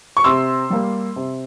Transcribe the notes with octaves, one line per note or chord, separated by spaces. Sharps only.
C#6
C3 C6 E6
G3 A#3
C3